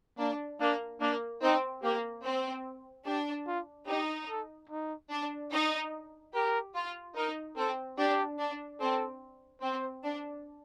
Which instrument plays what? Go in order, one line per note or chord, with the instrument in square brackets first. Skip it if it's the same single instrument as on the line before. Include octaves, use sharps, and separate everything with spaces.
[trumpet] A#3 [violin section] D4
[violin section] A#3 [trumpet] D4
[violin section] A#3 [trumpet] D4
[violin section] C4 [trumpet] D#4
[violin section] A#3 [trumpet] G4
[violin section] C4
[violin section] D4 [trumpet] G4
[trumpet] F4
[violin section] D#4 [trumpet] G4
[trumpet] A4
D#4
[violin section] D4
D#4
[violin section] G4 [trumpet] A#4
[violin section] F4
[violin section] D#4 [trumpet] A#4
[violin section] C4 [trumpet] A4
[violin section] D4 [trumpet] G4
[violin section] D4
[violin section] C4 [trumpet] A4
[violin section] C4 [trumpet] C5
[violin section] D4